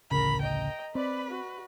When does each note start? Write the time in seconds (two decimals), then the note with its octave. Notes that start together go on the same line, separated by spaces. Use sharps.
0.11 A1 D2 C#3 A#4 A#5 B5
0.42 D#5 G5 A#5
0.95 C4 B4 D5 B5
1.30 F#4